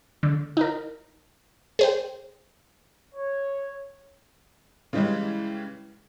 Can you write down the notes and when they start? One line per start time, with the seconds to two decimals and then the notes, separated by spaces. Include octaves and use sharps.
0.23 D3
0.57 D#4 A#4
1.79 G#4 C5 G5
3.15 C#5
4.93 C#3 E3 G3 G#3